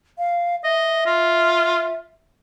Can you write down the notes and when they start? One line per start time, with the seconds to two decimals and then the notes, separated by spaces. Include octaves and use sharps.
0.18 F5
0.64 D#5 E5
1.06 F4